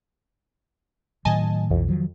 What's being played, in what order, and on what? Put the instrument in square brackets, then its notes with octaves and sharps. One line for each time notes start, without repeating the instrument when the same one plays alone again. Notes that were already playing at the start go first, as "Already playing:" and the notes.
[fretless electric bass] A2 D#3 F#3 [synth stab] D#5 G#5 A5
[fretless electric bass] B1 E3 [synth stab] F2
[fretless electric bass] D#3 F3 F#3